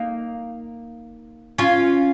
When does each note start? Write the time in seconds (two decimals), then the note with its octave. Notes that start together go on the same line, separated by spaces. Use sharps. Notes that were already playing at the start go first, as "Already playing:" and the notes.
Already playing: A#3 D#4
1.58 C#4 F4